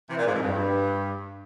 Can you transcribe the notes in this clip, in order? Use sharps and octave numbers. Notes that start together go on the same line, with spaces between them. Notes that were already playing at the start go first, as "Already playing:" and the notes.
C3 E3
A#2
G#2
F2
G2